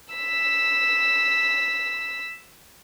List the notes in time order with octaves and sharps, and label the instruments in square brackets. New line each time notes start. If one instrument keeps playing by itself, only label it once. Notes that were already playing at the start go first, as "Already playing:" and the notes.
[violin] E6 B6